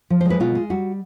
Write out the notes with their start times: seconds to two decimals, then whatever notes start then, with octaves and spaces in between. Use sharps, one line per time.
0.10 F3
0.21 C5
0.25 G#3 B4
0.40 B2 F4
0.55 G#3
0.70 G3 F#4